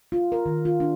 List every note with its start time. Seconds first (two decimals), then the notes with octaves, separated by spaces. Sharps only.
0.12 F4
0.32 A#4
0.46 D#3
0.65 F4
0.80 D4